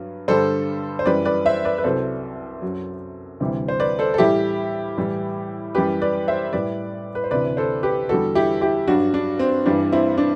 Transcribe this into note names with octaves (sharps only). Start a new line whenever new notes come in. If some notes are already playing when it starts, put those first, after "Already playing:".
Already playing: G2 F#3
G2 D3 G3 A4 C5
C5
F#2 E3 G3 B4 D5
B4 D5
C5 E5
B4 D5
B4
C2 C3 F#3 A4 C5
F#2 F#3
D2 C3 E3 G3
C5
B4 D5
A4 C5
A4
A2 E3 G3 E4 G4
A2 E3 G3
F#2 E3 G3 G4 B4
B4 D5
C5 E5
A2 G3 B4 D5
B4
C5
D2 C3 E3 B4 D5
A4 C5
G4 B4
E2 D3 G3 F#4 A4
E4 G4
E4 G4
G2 F#3 D4 F#4
D4
C4
G2 E3 G3 D4
C4 E4
D4